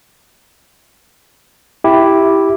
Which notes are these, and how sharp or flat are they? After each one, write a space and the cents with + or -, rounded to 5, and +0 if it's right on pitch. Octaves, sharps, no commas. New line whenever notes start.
E4 +0 G4 +0